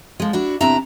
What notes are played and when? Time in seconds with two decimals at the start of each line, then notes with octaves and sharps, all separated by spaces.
0.20 F3 G#3
0.33 D4 E4 F#4
0.61 E2 C3 D4 E4 E5 A#5